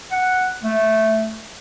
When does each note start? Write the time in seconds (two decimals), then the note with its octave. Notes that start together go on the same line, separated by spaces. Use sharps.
0.12 F#5
0.64 A3